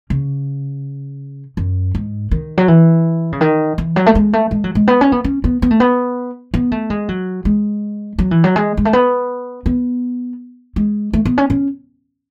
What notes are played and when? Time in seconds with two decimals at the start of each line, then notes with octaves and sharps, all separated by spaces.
0.10 C#3
1.57 F#2
1.95 G#2
2.31 D#3
2.58 F#3
2.68 E3
3.32 C#3
3.41 D#3
3.78 E3
3.96 F#3
4.06 A3
4.15 G#3
4.33 A3
4.51 G#3
4.64 F#3
4.75 G#3
4.88 B3
5.01 C#4
5.12 B3
5.24 C#4
5.44 B3
5.62 B3
5.71 A3
5.80 B3
6.54 B3
6.72 A3
6.90 G#3
7.09 F#3
7.45 G#3
8.19 F#3
8.31 E3
8.44 F#3
8.56 G#3
8.77 G#3
8.85 A3
8.93 B3
9.66 B3
10.76 G#3
11.13 A3
11.25 B3
11.38 C#4
11.50 C#4